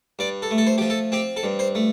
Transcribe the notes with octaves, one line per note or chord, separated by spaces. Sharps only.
G2 D5
A4
A3
A4
C5
F3 G4
A4
C4 G4
A4
G2
C5
A3